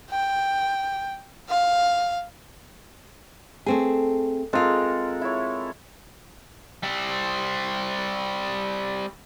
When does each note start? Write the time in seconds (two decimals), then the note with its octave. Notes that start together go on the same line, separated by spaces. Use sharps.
0.11 G5
1.49 F5
3.66 A3 C4 G#4
4.53 G#3 C4 F4 A4 A#4
5.21 E4 C#5
6.83 G3 C4